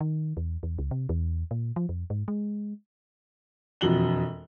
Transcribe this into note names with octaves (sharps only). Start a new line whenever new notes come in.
D#3
E2
E2
C#2
C3
E2
A#2
F3
F2
G#2
G#3
E1 F2 F#4 F#7 G7